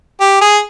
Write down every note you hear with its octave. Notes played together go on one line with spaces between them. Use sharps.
G4
G#4